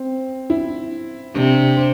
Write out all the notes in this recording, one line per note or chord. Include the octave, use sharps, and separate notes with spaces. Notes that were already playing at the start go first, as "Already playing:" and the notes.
Already playing: C4
E4
C3 D4
C5